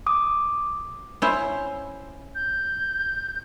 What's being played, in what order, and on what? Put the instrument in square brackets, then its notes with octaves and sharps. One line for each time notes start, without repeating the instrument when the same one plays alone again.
[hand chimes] D6 D#6
[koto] C#4 E4 C5
[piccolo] G6